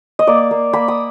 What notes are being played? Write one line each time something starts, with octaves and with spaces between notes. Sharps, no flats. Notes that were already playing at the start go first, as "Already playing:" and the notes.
D#5
A#3 D5
A#3
A#3 B5
D#6